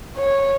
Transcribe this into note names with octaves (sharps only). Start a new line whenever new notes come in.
C#5